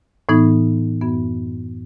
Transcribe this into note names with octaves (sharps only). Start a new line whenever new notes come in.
A2 E3 B3 D#4
F#2 E3 B3